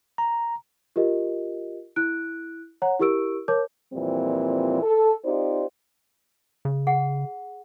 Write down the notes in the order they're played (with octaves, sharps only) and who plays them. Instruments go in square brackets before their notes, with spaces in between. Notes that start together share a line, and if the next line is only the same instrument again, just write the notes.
[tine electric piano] A#5
[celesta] F4 G4 A#4 D#5
E4 F#6 D7
C#5 F#5 A#5
E4 G4 A#4 C#6 E6 D7
A#4 C#5 A5 D6 G6
[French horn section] F2 A#2 E3 G3 C4
A4
C4 D#4 F4 G4 C5 D5
[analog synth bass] C#3
[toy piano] G#4 F#5